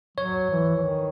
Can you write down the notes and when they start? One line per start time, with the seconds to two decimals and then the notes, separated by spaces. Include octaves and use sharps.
0.18 F#3 C#5
0.51 E3
0.76 E3
0.83 D#3